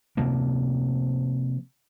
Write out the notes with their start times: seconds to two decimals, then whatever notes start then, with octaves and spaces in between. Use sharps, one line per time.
0.17 C3 F3 A#3